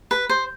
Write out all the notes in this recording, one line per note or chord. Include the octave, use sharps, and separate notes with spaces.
B4
C5